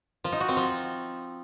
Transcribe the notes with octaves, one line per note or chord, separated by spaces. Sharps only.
F3
D#4
F#4
C4
F3